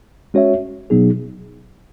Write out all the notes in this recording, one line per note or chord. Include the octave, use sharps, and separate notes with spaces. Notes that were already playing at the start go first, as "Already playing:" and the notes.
G#3 C#4 F#4 C#5 E5
B2 F#3 B3 D#4 G#4